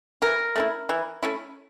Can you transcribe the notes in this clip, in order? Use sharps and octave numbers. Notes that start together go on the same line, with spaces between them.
E3 A#4
A3 C#4 E4
E3
A3 C#4 E4